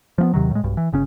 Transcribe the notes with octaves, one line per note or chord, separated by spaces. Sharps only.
F3 A#3 B3
D#2 C3 D#3 F#3
A2 G#3
B1 G2
E3
G1 C#3 C#4